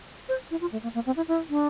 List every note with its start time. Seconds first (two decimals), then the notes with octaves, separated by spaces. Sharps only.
0.29 C5
0.51 E4
0.61 F4
0.72 A3
0.83 A#3
0.95 A#3
1.06 C4
1.17 E4
1.28 E4
1.50 D4